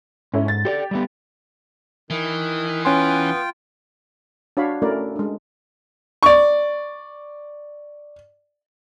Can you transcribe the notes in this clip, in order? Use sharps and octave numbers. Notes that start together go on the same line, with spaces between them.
G#2 C#4 E4 A4
A6
G4 A4 C5 D5
G3 A3 B3
D#3 E3
B3 C#4 F4 G5 G#5 C6
D4 F#4 C#5 D5 F5 B5
A3 C#4 E4 F#4 A#4 D5
G#3 D4
D5 C#6